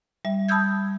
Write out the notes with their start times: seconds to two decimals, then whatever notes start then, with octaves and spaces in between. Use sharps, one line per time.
0.25 G3 E5
0.49 A5 B5 D#6 E6 G6 G#6